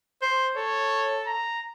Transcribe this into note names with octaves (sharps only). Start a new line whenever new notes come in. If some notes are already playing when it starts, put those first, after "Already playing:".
C5
A4 C#5
A#5